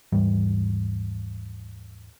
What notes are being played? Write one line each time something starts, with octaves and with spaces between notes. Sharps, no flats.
D#2 G#2 E3 G3